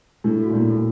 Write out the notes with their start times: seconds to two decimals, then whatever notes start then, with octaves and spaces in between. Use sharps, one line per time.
0.24 A2 D4
0.39 F#4 A4
0.50 A#2
0.54 A2 D4
0.69 F#4 A4
0.76 A2